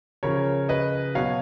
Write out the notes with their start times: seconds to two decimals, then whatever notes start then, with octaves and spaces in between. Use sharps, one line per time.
0.23 C#3 F3 A#4 C#5
0.69 B4 D#5
1.15 B2 F#3 C#5 F5